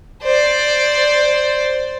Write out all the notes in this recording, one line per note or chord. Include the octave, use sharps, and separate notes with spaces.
C5 D5